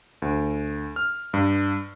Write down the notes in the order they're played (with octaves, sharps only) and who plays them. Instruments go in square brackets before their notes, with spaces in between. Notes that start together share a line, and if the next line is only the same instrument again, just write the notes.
[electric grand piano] D2
F6
G2